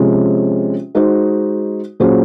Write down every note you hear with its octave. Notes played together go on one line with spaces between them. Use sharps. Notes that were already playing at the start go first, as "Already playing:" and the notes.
Already playing: C3 F3 G#3 C#4
G#3 D#4 F#4 C5
A#2 F#3 C#4 G#4 C5